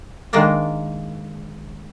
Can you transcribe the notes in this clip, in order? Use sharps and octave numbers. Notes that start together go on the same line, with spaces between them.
D#3 G#3 A#3 D4